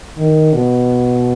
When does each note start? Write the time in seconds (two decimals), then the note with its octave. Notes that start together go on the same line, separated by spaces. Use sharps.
0.18 D#3
0.53 B2